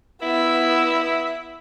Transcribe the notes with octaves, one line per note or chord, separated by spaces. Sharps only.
B3 E4 E6